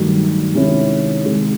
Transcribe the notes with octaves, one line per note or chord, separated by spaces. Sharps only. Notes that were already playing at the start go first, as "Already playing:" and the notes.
Already playing: G2 D#3 F#3 A3
C3 D#3 G#3 C#4 E4
C3 D#3 G#3